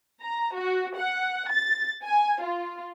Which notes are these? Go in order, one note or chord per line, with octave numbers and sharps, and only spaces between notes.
A#5
F#4
F#5
A6
G#5
F4